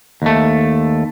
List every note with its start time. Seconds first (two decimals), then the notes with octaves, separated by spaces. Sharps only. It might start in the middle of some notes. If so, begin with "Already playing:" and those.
0.22 D#2 A3